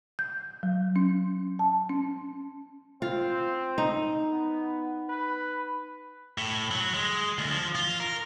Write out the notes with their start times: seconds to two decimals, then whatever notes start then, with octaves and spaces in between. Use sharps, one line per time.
0.19 G6
0.63 F#3
0.96 C#4
1.59 A5
1.89 C#4
3.02 C4 F4
3.78 D#4
4.31 B3
5.09 B4
6.38 A2
6.71 F#3
6.94 G#3
7.38 D2
7.50 F3
7.75 F4
8.00 A#4